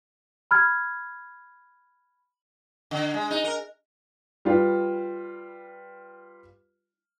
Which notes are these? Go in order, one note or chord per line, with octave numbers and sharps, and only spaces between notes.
B5 F6 G#6
D3
G#3
D#4
A#4
G3 F4 B4